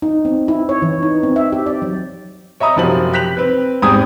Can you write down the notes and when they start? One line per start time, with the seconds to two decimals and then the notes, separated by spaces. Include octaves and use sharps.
0.02 D#4
0.25 C4
0.48 E4
0.69 C#5
0.82 E3
1.03 D#4
1.23 C4
1.36 E5
1.53 G4
1.66 D5
1.82 F#3
2.60 C#5 D#5 E5 A#5 D#6
2.76 F#1 C3 F3 F#3 F#7
3.13 G4 F#6 B6 F7 F#7
3.37 C4 B4
3.82 E2 G#2 C4 G4 D#6 G#6